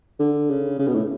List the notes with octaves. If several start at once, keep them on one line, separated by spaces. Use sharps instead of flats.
D3
C#3
C#3
B2
A2